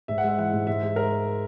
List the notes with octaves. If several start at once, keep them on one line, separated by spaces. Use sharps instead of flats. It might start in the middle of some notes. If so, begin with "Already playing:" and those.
G#2 E5
F#5
G#3 E5
E3 F#5
G#2
G#2 E5
G#3
A#4